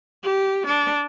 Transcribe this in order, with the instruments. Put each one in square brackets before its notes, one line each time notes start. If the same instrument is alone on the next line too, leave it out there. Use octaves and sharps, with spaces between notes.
[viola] G4
D4